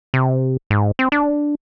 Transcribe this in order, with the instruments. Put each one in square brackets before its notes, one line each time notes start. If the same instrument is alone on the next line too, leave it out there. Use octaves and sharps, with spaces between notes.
[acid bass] C3
G#2
C4
D4